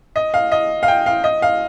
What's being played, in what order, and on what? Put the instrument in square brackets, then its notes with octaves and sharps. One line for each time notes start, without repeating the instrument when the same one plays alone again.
[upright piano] D#5
F5
D#5
F5
G5
F5
D#5
F5